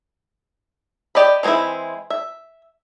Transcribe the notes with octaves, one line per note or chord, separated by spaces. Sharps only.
G4 D5 D#5 B5
E3 G#3 B3 C4 E4
E5